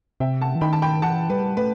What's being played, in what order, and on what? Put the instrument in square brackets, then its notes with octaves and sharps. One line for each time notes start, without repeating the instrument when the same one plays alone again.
[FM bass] C3 [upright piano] E5 G5
[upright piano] F#5 A5
[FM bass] E3
[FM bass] D#3 [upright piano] G5 B5
[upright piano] A5
G5 B5
[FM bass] E3 [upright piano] F#5 A5
[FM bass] G3 [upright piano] B4
[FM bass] A3 [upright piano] B4